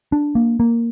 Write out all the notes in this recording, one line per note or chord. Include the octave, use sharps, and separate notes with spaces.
D4
A#3
A#3